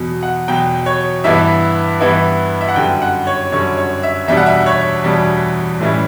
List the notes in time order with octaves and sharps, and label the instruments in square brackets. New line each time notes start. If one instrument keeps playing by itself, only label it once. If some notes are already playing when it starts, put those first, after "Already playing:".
Already playing: [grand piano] E2 B2 F#3
F#5
E2 B2 F#3 G5
C#5
G2 E3 B3 E4 E5
G2 E3 B3 E4
E5
F#5
F#2 D3 G3 G5
F#5
C#5
F#2 D3 G3 C#5
C#5
E5
E2 B2 G3 D4 E5
F#5
E5
C#5
E2 B2 G3 D4
A2 E3 G3 C#4 E4